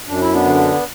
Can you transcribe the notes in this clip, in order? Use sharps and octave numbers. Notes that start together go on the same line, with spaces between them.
F#2 D4
E4
B3 D4
D3